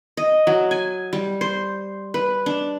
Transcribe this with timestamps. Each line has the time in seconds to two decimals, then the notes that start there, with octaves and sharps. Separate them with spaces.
0.17 D#5
0.47 F#3
0.71 G#5
1.13 G3
1.41 C5
2.14 B4
2.46 D4